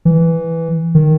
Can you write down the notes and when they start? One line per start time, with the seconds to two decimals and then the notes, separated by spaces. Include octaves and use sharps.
0.05 E3
0.95 D#3